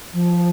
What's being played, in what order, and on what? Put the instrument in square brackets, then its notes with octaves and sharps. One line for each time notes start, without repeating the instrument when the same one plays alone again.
[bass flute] F3